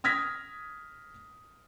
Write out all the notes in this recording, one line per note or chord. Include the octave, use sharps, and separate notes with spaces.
D#6 F6 G#6 A#6 B6